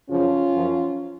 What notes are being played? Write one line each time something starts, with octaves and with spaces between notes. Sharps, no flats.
F#2 C#3 F3 C#4 F4
F#2 F3